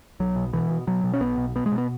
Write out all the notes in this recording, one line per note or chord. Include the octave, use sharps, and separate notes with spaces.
B1 F#3
B2
B2 E3
B2
B2 F#3
B2
C#4
B1 B3
B2
B2 B3
G#3
B2
B3